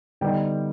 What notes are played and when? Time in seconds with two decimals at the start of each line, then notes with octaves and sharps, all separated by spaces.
0.21 D3 G3 B3 D#4 G5